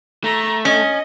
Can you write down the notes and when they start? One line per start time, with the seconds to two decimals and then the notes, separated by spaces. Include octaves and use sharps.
0.24 A3 A#5
0.65 C#4 D#5